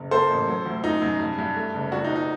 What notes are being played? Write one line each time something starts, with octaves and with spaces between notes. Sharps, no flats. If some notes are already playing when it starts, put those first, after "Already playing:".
Already playing: F#1
A#3 A4 C5
A1
F#3
D2
F#2 D#4
F#2
G2
G2
A3
F#1
A#1 D4 F#4
D#4
A#1
D#4